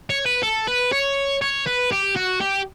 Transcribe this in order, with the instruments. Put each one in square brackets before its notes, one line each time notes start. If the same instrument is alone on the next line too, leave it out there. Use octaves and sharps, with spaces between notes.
[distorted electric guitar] C#5
B4
A4
B4
C#5
C#5
B4
G4
F#4
G4